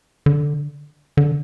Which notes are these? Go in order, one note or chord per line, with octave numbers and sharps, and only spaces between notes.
D3
D3